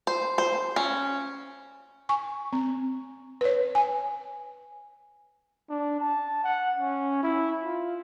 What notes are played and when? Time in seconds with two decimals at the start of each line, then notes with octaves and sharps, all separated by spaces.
0.07 C5
0.38 C5
0.76 C#4
2.09 G#5 C#6
2.53 C4
3.41 B4 C#5
3.75 G#5
5.69 D4
6.00 A5
6.44 F#5
6.77 C#4
7.23 E4
7.63 F4